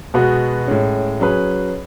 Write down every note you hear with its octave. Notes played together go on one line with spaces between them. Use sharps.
B2 G#3 B3 F#4
A2 G#3 C#4
F#3 C#4 G#4 B4